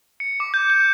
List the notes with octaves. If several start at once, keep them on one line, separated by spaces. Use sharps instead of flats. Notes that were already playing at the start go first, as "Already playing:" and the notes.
C#7
D6
G6
G6